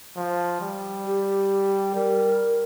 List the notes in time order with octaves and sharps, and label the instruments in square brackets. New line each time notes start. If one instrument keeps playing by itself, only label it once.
[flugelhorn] F3
G3
[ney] G4
[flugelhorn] G3 [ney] A#4